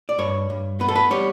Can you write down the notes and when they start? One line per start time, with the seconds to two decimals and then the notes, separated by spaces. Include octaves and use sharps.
0.09 D5
0.18 G2 C#5
0.50 G2
0.80 B3 B4
0.88 A4
0.96 B4
1.11 G3 C#5